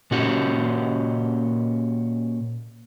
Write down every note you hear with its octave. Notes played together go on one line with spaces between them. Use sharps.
A#2 C#4 F#4 G4